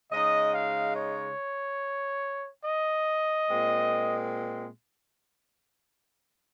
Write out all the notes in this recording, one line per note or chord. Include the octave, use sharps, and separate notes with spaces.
C#3 G#3 D#4 D#5
F5
C#5
D#5
A#2 G#3 C4